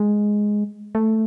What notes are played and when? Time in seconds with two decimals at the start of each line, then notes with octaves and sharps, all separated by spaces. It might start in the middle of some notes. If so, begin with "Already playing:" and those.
Already playing: G#3
0.95 A3